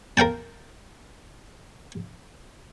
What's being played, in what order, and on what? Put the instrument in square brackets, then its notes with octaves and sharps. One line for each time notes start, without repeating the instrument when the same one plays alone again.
[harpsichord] A#4 F5 G5 A5